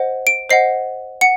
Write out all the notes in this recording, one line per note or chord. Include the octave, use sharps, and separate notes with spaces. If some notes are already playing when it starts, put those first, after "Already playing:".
Already playing: C5 D#5 F#5
D7
C5 D#5 F#5 C7
F#5 C#7